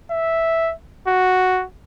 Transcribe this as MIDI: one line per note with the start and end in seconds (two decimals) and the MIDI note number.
0.11 0.73 76
1.08 1.64 66